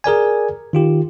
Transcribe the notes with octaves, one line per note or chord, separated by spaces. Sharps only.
G#4 A#4 D5 G#5
D#3 F4 G4